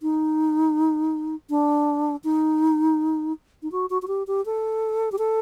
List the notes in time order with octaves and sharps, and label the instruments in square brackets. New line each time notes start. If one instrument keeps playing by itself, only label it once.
[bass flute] D#4
D4
D#4
D#4
F#4
F#4
F#4
G4
G4
A4
G4
A4